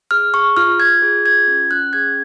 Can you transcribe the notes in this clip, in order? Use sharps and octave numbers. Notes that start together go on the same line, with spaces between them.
G#4 F6
G#4 C#6
F4 F6
F4 G#6
G#4
F4 G#6
C#4
C#4 F#6
G#4 G#6